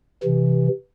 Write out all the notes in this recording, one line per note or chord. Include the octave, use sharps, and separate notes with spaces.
C3 E3